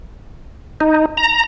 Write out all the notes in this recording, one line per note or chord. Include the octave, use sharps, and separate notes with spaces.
D#4
A#5